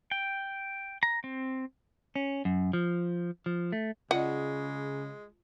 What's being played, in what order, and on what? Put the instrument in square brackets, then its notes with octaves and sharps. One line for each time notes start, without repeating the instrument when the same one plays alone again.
[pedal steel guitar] G5
A#5
C4
[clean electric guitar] C#4
F#2
F3
F3
A3
[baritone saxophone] C#3 [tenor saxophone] G#3 [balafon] F4 D5 D#5 [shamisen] F#5